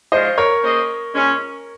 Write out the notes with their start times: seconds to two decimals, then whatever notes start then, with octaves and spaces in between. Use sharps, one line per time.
0.12 G#2 F3 G#3 C#4 F4 C5 D#5
0.38 A#4 C#5
0.63 A#3 C#4 G#4 C5 D#5
1.14 A#2 G#3 C#4